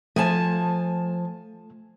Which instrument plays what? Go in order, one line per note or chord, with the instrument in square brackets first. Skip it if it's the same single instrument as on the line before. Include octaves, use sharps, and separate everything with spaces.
[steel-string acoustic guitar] F3 G#5 A5 [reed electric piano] A3